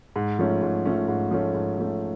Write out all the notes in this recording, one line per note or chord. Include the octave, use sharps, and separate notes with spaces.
G#2
F3 A3 C#4
G#2
F3 A3 C#4
G#2
F3 A3 C#4
G#2
F3 A3 C#4